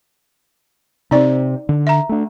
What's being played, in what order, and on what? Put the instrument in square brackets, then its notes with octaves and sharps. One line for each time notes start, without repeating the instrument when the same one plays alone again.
[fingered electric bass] C3 C4 [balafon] D#4 D5
[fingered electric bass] D3
[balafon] E5 A#5
[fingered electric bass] A3 D4